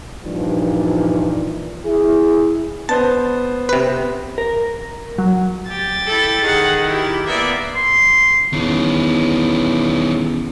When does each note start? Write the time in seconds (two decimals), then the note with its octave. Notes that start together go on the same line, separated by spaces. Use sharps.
0.24 G2 A#2 E3 F3 D#4
1.85 E4 G#4
2.89 B3 C5 A5
3.69 C3 B4
4.38 A#4
5.18 F#3
5.69 G4 A6
6.07 E4 A4
6.42 D#3 G#4 F#5
6.86 E4 G4
7.27 A#3 B3 D5 E5
7.76 C6
8.53 E2 D#3 C#4